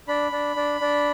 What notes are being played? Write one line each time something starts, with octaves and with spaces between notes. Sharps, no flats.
D4 B5
D4
D4
D4